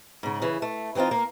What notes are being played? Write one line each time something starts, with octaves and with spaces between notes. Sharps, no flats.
G#2 C#3
C#3 E3
A3
E3 B3 C4 D#4 F4
A#3